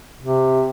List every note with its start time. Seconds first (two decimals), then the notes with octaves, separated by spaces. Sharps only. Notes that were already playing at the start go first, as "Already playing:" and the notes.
0.22 C3